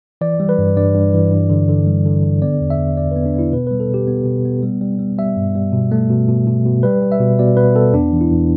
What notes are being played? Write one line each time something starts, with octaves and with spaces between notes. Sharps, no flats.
E3 D5
G3
B4
G2
G2 D5
G2
E3
G2
D3
D3
G3
D3
D3
B3 D5
E2
E5
E2
E2 D5
B3 B4
D4
B3 E4
B2 B4
G3 B4
A4
B2 G4
B3
B2
B3
G3
G3
G3
G3 E5
G2
G3
B2
A3
B2
B2
B2
B2
G3 B4
G3
E5
B2
B2 D5
B3 B4
B3 A4
E2 D4
E3
E4
E2